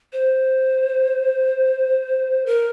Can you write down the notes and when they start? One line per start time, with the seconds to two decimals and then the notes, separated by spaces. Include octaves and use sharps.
0.13 C5
2.46 A#4